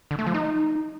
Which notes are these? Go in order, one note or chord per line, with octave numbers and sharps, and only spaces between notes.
D3
A3
F3
D#4